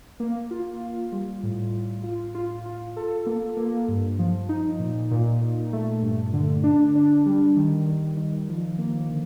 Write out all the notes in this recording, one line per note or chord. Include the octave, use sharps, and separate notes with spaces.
A#3
F4
F4
G3
A2
A2
F4
F4
F4
A4
A#3
A#3
G2
F3
D#4
A#2
A#2
A#2
A3
G2
D3
D4
D4
G3
D#3
D#3
D#3
F3
A#3
D3